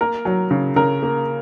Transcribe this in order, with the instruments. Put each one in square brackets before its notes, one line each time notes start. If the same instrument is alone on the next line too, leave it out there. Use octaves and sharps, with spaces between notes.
[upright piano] A#3 A#4
F#3
C#3
C#3 A#4
A#3